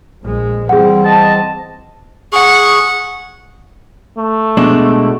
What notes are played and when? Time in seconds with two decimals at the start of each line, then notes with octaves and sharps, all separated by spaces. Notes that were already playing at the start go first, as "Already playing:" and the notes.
0.22 A#1 G#3
0.69 E3 G3 C4 G#4 F#5
1.05 D#5 A5
2.33 G#4 F#5 C#6
4.18 A3
4.57 B2 G#3 D4